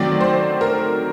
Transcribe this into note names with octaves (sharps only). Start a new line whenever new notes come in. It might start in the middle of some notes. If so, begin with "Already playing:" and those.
Already playing: D#3 F#3 A3 C4 D5
C5
A#4